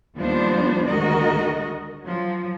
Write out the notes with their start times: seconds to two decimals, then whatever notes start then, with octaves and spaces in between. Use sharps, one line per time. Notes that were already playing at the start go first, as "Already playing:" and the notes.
0.17 D#2 F3 G3 B3 D4 C5
0.88 D2 D#3 G#3 F#4 A#4 D#5
2.02 F3 F#3